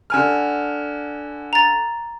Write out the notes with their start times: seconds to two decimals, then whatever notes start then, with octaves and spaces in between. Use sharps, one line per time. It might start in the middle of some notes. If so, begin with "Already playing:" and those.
0.10 D3 G#5 F6
1.53 A#5 A6